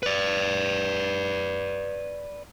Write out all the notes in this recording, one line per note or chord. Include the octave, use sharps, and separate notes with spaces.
B4 D5